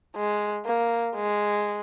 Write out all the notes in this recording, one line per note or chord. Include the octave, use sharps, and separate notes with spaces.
G#3
A#3
G#3